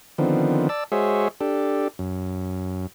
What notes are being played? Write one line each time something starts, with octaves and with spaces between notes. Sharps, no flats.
D3 D#3 F3 B3 C4
D5 A5 E6
G#3 F#4 G#4 C5 C#5 E5
D4 G4 A4
F#2